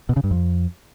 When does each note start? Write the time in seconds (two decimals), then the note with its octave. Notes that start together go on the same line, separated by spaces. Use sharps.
0.09 B2
0.16 C#3
0.24 G2
0.31 F2